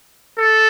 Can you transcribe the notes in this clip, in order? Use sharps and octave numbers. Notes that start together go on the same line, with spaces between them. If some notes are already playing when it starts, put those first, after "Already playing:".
A4